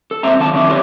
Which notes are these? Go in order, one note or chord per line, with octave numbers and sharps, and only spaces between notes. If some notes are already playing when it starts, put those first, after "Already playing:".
A4
A#2 G#3 C4 C5 E5 A#5
D3 D#3 F#3 F5 A5
D#3 F3 C4 D4 D5 E5
E4 G4 A4 B4 C#5 D5